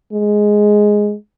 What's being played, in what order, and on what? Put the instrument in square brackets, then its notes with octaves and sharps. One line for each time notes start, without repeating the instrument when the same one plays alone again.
[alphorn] G#3